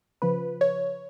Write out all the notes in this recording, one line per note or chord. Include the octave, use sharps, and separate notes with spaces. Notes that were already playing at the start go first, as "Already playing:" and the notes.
C#3 F3 B4
C#5